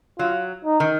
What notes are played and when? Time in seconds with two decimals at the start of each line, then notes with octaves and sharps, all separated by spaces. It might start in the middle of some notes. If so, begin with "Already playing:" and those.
0.19 F#3 F4
0.65 D#4
0.80 D#3